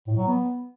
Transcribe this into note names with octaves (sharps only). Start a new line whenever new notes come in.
A2
F#3
B3